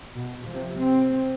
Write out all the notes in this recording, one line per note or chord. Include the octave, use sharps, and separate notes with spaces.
B2
C3 F3
C4